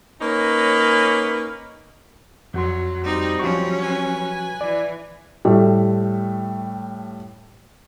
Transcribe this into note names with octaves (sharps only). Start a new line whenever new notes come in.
A#3 C#4 D#4 B4 C#5
F2 F#3 F#4 C6
G3 C4 D#4
F3 F#3 C#4 F#4 C#6
B4 G#5
E3 D5
A2 G3 A3